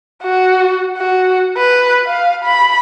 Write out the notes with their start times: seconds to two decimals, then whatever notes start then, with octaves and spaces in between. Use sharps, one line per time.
0.23 F#4
0.98 F#4
1.58 B4
2.06 F5
2.45 B5